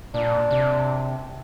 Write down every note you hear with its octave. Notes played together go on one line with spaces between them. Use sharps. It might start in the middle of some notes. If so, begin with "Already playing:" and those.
A#2 D4
C3